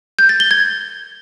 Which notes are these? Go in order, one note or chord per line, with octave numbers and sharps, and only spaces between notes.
G6
A6
G7
G#6